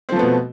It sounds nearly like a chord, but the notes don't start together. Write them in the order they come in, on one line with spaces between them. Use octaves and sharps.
C4 F3 A3 B3 B2